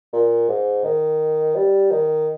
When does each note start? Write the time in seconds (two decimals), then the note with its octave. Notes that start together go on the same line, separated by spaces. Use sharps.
0.13 A#2
0.49 G#2
0.84 D#3
1.56 G3
1.91 D#3